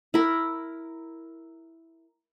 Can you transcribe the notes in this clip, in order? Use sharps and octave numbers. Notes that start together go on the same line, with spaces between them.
E4 A#4